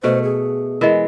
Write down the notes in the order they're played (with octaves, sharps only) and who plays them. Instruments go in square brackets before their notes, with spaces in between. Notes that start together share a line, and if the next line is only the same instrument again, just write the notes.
[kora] B2 A3 F#5 [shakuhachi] C5
[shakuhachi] G#4
[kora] E3 G#3 [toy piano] A#4 D#5